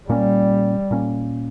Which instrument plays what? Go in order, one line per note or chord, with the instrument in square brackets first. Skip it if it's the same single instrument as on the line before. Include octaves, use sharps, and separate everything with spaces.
[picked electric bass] A#2 A#3 C#4 [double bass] G3
[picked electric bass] A#2 A#3 C#4